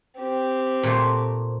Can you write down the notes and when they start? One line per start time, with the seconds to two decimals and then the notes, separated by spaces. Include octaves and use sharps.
0.20 C4 G4
0.83 A#2 A3 C5